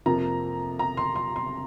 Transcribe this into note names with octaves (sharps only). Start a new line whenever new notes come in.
F2 C3 F3 A#3 A#5
A#5
C6
C6
C6